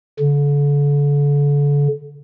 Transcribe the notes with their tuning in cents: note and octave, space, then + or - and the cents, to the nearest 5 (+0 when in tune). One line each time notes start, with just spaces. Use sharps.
D3 -35